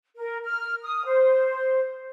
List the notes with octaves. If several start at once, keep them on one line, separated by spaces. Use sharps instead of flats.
A#4
F6
D#6
C5